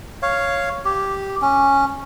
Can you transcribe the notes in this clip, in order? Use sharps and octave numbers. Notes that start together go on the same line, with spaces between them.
C#5 F5
G4
C#4